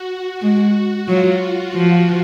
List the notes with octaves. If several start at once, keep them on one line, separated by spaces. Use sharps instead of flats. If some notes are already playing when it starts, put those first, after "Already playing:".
Already playing: F#4
G#3
F#3 F4
F3